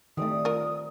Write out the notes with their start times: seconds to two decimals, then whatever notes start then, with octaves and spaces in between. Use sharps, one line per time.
0.17 D#3 G3 A3 C4 D#6
0.45 F4 A#4